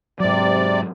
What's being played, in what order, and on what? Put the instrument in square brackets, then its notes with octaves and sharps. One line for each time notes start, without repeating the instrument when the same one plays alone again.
[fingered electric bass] G#2 F#3 [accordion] C3 D5